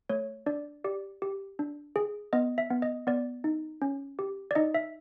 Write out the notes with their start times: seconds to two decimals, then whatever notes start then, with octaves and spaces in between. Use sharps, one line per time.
0.09 A3 C#5
0.46 D4 D5
0.84 G4 D5
1.22 G4
1.59 D4
1.96 G#4
2.33 B3 D#5
2.58 E5
2.70 B3
2.82 D#5
3.07 B3 D5
3.44 D#4
3.82 C#4
4.19 G4
4.51 D5
4.55 D#4 D#5
4.74 E5